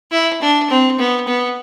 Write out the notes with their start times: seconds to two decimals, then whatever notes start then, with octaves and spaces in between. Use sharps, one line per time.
0.11 E4
0.41 D4
0.70 C4
0.99 B3
1.27 B3